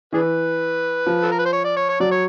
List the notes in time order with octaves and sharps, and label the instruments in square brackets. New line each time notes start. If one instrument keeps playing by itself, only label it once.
[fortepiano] E3 [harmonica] D4 G#4 B4
[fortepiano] F3
[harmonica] A4
A#4
B4
C5
C#5
D5
C#5
C#5
[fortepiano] F#3 [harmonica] D5
[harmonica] C#5